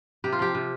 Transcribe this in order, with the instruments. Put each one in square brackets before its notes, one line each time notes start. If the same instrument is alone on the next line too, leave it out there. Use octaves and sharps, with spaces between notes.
[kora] C3 G4
F4
F3 G4
C3